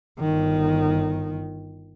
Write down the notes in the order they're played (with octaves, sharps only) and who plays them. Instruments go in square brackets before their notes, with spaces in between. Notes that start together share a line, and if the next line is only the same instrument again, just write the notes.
[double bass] G1 D#3